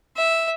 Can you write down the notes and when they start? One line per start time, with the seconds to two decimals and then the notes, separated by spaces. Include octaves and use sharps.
0.16 E5